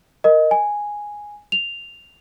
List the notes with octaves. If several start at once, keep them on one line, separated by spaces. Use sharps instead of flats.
A#4 D#5
G#5
F7